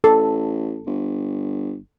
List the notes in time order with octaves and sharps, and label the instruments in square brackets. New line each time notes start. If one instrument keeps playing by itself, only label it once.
[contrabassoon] A1 [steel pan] A4
[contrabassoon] G1